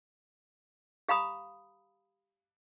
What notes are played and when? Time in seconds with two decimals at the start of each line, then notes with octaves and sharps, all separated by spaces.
1.08 G4 F5 A#5 B5 D#6